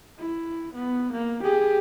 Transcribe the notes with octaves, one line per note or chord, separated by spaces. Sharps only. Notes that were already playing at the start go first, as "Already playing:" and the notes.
E4
B3
A#3
G4 G#4